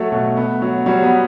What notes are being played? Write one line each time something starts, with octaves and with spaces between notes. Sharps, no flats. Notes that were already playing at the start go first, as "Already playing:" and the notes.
Already playing: F#3 A3
B2
B3
F#3
F#3 G3
B3